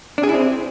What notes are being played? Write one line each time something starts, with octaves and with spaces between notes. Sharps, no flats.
D4
G#4
E4
C4